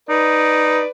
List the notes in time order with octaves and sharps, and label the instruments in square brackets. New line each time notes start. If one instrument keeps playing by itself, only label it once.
[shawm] D#4 [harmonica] B4 D5